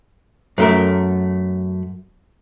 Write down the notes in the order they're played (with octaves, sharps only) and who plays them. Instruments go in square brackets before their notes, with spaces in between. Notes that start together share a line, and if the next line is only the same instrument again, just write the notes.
[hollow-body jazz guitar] F#2 A3 A#4